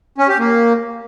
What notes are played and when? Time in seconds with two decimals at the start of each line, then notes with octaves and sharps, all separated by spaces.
0.18 C#4
0.28 G4
0.38 A#3